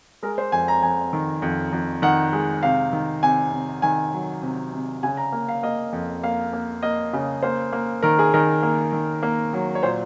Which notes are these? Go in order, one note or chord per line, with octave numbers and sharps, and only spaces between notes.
G#3 A#4
C5
F2 G#5
A#5
F2 G#5
D#3
F2
F2
D#3 F#5
G#3
C3 F5
D#3
C3 G#5
C3
D#3 G#5
F#3
C3
C3
C#3 G#5
A#5
A#3
F5
A#3 D#5
F2
A#3 F5
A#3
A#3 D#5
C#3
A#3 C5
A#3
D#3 A#4
G#4
D#3 A#4
A#3
D#3
A#3
F#3
C#5
A#2 C5